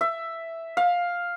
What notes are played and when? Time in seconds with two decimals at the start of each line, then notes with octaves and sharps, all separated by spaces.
0.01 E5
0.77 F5